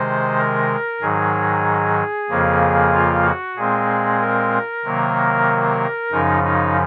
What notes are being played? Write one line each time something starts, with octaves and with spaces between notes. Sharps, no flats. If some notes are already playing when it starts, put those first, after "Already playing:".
Already playing: C3 D#3 G#3 C5
A#4
G#2 D#3 F#3 G#4
F2 C#3 F3 A#3
F4
F#4
A#2 G#3 C4 G#4
A#4
C3 D#3 F#3 A#3
F#2 C#3 F3 D#4
D#4